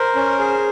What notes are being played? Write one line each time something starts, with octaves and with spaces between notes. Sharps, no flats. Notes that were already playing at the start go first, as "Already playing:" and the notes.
Already playing: A#4 C5
C#4
G#4